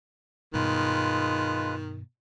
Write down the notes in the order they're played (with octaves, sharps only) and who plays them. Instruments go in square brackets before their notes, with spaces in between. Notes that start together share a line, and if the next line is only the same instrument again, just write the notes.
[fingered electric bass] G2 B2 [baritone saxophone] D#3 [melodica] G#3 F4 B4